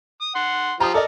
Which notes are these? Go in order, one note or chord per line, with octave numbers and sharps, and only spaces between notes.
D#6
F#5 C6
F3 F4 G4 A#5 D#6
A4 A#4 D5 D#5